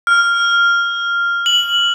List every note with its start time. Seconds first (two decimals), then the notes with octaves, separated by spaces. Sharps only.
0.07 F6
1.46 F#7